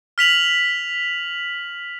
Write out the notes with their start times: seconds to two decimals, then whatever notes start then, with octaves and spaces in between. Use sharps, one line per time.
0.18 F6 B6 F7 F#7